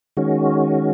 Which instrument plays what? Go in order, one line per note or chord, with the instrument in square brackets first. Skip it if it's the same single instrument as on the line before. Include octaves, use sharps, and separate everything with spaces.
[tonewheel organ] D#3 G#3 C#4 F#4